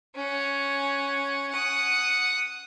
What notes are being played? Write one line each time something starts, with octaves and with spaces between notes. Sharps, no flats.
C#4 F#5
F#5 D#6